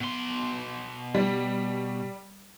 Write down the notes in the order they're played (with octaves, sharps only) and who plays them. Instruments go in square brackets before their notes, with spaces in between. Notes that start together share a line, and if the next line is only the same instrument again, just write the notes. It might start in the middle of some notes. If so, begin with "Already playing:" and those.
[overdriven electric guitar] B2 C6
[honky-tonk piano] G3